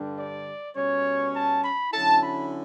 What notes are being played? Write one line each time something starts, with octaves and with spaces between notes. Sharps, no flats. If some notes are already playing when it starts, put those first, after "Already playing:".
Already playing: G2 D3 G3 D4
D5
B2 G3 C#4 C#5
A5
B5
D3 F#3 C#4 E4 A5
B5